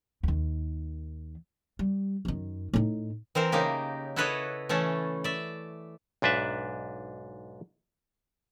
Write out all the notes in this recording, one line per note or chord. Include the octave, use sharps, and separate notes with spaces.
D#2 D#3
G3
F#2 D#3
A2 D#4
E3 C4 A#4 C5
C#3 A#3 D#4 G4
E4 F#4 A4 B4 C#5 D#5
E3 A3 C#4 A4
D5 E5
B1 G#2 D4 B4 E5